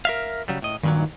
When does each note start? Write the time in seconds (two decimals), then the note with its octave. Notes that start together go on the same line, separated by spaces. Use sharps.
0.05 A#4 E5 F5
0.48 C#3 F#3 G3
0.62 A2 D#5
0.83 G2 A#2 D#3 F#3